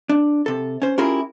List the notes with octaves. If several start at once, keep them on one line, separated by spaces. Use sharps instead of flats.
D4
C3 A4
C#4 C5
C#4 E4 F4 G4 G#4 A#4